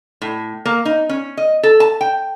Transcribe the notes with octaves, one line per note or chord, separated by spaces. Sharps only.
A2
A#3
D#4
C#4
D#5
A4
A5
G5